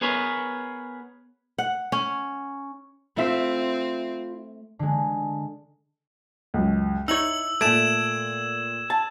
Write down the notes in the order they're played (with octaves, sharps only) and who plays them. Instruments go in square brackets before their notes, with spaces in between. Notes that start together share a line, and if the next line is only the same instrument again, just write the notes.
[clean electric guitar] B3 G#4 A#4 B4 C#5
[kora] F#5
C#4
[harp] A3 E5 B6 [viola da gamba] C4 [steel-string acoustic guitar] E4 F4
[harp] D3 G#3
[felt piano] C#2 F#2
[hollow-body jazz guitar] D#4 C#5 [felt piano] E4 [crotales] E6 F#7
[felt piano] A#2 D7 [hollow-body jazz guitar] A3 [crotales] G#6 E7
[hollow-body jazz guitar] A5